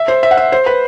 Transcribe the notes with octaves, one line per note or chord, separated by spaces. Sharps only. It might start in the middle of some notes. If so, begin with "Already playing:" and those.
Already playing: E5
C5
E5
F#5
E5
C5
B4